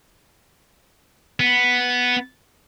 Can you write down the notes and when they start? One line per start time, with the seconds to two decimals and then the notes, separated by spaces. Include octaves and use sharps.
1.40 B3